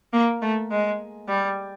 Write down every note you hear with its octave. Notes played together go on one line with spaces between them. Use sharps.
A#3
A3
G#3
G3